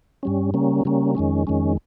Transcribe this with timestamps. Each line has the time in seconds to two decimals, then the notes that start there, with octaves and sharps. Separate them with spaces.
0.23 G2 G3 C#4
0.54 C#3 G3 A#3 C#4
0.85 C#3 G3 A#3 C#4
1.15 F2 D#3 G#3 C#4
1.47 F2 D#3 G#3 C#4